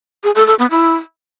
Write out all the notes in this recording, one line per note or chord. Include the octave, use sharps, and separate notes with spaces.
G#4
A4
A4
B3
E4